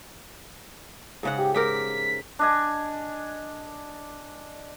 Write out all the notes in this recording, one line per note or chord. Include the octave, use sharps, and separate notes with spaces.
G#2 C#3 F#5
G4
G#2 G4 A#4 B6
D4 D#5 G#5